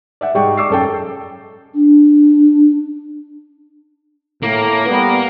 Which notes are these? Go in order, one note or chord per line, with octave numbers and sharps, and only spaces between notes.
D5 E5 F#5
G#2 G3 G#3 D5 G5 C#6
C#6 D6 E6 C7
F#2 A4 G5
D4
A2 A#3
G3 B3